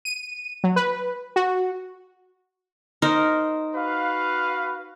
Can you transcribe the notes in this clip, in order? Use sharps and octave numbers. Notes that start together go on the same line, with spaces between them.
D#7
F#3
B4
F#4
D#4 A#4 C5
F#4 B4 F5